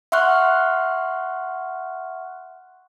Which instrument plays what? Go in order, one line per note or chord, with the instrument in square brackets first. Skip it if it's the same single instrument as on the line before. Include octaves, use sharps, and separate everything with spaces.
[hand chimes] E5 F#5 C6 C#6 F6 F#6